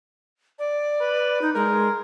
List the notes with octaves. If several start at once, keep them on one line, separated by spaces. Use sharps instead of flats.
D5
B4
D#4
G#3 A#4